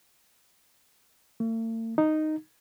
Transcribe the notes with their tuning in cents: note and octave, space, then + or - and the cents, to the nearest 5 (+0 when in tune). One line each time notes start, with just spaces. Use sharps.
A3 +45
D#4 -5